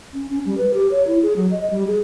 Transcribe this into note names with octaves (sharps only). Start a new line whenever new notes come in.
C#4
C#4
G3
B4
G4
C#5
E4
G#4
F#3
D#5
G3
G#4